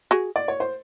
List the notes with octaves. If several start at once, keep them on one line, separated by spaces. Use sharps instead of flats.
F#4 G#4
D5
C#5
C5